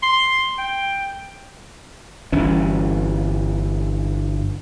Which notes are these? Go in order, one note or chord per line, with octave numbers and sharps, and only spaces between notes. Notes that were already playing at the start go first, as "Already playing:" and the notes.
C6
G5
G1 E3 C#4